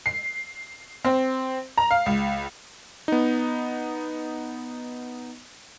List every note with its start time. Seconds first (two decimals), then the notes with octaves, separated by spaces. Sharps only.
0.06 C7
1.05 C4
1.78 A#5
1.91 F5
2.06 C#2
3.08 B3 D#4